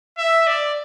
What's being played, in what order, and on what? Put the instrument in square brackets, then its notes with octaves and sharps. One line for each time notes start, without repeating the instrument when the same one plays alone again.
[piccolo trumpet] E5
D5